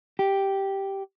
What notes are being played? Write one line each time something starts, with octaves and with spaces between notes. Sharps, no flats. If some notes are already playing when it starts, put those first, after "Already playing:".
G4